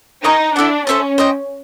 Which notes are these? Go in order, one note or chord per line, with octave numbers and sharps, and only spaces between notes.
D#4 A#4 D#5 G#5 C#6
D4 E4 A4 D5 F#5
C#4 A4 C5 E5 A5
C5 D#5 G5